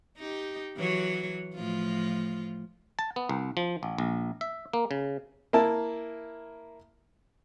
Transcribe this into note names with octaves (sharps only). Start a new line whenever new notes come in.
D#4 G4
E3 F#3 C#5
A2 F3 F4
A5
B3
C2
F3
A1
A#1
E5
A#3
C#3
A#3 E4 A5